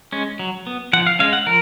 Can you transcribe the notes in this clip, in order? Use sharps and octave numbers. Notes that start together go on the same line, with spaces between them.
G#3 C#4
F#3
B3
F3 F#5
F5
G#3 C#4 F5
F#5
F3 A#4